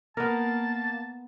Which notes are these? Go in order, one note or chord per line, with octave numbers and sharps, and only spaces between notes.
A#3 B3 A#4 A5